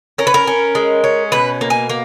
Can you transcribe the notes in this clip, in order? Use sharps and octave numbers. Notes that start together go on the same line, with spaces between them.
C#4 A#4
B4
A#4
C#4
G#3
C#4
B2 B4
A#3
G#5
A#3